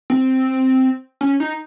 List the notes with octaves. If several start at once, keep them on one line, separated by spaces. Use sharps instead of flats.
C4
C#4
D#4